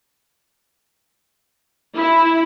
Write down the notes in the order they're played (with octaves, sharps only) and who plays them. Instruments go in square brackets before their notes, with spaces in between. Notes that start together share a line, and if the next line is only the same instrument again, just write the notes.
[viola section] E4